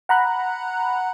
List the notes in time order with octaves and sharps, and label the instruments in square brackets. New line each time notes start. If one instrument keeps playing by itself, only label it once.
[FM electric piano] F#5 A#5 B5 F#6